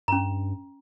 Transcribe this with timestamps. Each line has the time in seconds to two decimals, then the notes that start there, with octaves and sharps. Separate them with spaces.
0.08 G2 C#4 A#5